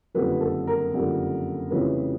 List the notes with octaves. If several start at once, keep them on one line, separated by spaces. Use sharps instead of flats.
F#1 F2 D3 G3 B4
A4
A#4
F#1 F2 D3 G3
F1 F2 C#3 E3 G3 B4